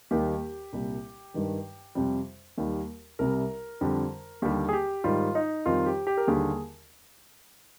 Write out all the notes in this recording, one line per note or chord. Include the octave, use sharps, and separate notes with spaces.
D#2 D#3 G3 G4
C2 A#2 G3
G2 D#3 G3
F2 C3 G3
D#2 D#3 G3
C2 C3 G3 A#4
F2 D3 G3
D#2 D3 G3 G4
G#4
G4
G#2 D#3 G3 F4
D#4
F2 D#3 G3 F4
G4
G4
A#4
D#2 D3 G3 G#4